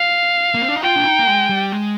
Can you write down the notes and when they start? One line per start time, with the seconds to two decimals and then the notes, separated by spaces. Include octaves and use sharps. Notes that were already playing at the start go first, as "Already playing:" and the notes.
Already playing: F5
0.54 A#3
0.62 C4
0.68 D4
0.76 D#4
0.83 F4 G5
0.96 D4
1.05 D#4
1.19 A#3
1.27 G#3
1.49 G3
1.72 G#3